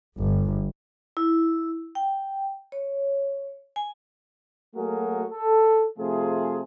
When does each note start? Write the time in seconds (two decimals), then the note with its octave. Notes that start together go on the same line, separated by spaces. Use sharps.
0.18 G1
1.17 E4
1.95 G5
2.72 C#5
3.76 G#5
4.76 F#3 A3 A#3 F#4 G#4 A#4
5.32 A4
5.98 C3 F3 A3 F4 G#4